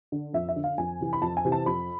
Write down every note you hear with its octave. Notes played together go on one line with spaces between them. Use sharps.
D3
F2 E5
E5
D3
F5
F2 G#5
C3 E3
B5
F2 A5
G#5
C3 E3
A5
F2 B5